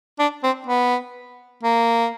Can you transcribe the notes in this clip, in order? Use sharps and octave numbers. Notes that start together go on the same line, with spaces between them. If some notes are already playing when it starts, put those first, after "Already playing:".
D4
C4
B3
A#3